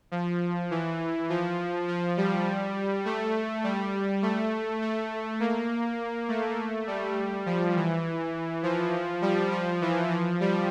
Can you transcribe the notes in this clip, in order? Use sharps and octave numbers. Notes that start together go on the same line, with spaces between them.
F3
E3
F3
F3
G3
A3
G3
A3
A3
A#3
A3
G3
F3
E3
F3
G3
F3
E3
F3
G3